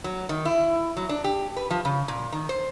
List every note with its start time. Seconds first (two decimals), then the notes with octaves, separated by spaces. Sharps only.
0.04 F#3
0.29 D#3
0.45 E4
0.97 F#3
1.09 D4
1.24 G4
1.57 B4
1.70 F3
1.85 C#3
2.08 A#2
2.32 D#3
2.49 C5